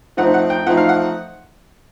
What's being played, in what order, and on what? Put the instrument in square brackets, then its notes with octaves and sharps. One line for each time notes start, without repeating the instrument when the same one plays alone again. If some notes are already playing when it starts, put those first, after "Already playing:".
[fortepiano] F3 A3 C4 D#4 F#5
F#5
G5
F3 A3 C4 D#4 F#5
F5
F#5